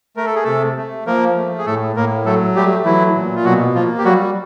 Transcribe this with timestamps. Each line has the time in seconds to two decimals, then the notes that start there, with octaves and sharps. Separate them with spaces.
0.17 A3 A#4
0.26 A4
0.35 G#4
0.44 C3 A3 A4
0.77 A3
1.06 F3 A#3 A#4
1.37 A3
1.58 G#4
1.66 A2 A3 A4
1.96 A2 A#3 A#4
2.26 F#3 A3 A4
2.55 G3 A3 G4
2.85 E3 F#3 E4
3.15 A#2
3.36 F4
3.45 B2 F#3 F#4
3.75 F3 A#3 F4
3.98 G4
4.05 F#3 G3 F#4